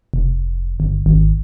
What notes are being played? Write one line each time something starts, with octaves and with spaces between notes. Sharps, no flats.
F1
G1
G#1